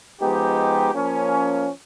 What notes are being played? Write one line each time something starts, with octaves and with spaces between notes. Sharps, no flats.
F3 G#3 B3 D#4 G4
F3 A#3 C#4